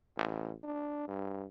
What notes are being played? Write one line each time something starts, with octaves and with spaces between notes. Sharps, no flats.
A1
D4
G2